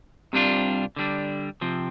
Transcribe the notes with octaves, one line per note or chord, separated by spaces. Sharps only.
C2 C3 G3 D4 F4
D3 G3 D4
C3 F3 C4